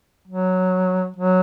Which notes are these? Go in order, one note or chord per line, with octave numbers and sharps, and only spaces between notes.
F#3
F#3